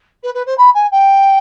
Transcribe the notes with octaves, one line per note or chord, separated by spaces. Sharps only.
B4
B4
C5
B5
G#5
G5